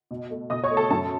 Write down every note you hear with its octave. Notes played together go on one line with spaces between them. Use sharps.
B2
A3
B2 D#5 D#6
C#5 C#6
A3
A4 A5
F#2 A4 A5